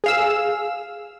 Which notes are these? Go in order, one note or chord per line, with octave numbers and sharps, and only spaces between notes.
G#4 F5 E6